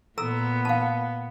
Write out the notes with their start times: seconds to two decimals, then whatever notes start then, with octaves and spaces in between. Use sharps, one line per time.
0.18 A#2 B3 A4 A#5 E6
0.65 F5 A5